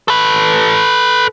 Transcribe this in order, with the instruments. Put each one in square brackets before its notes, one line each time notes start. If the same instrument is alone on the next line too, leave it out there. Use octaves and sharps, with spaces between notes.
[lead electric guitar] A4 B4